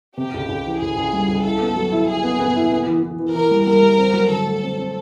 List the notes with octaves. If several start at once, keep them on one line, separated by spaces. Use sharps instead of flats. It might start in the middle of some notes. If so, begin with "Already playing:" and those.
C3 G4
C#2
C#2
E3
C#2 G#4
C#2
G3
C#2
E4 A4
B3
F#3
E4
E4 G#4
B3
B3
E4
B3
E3
E3
E3
E3 A#4
G3
G3 A#4
G3
C4
F#3
D3 A4
A3
C4
C4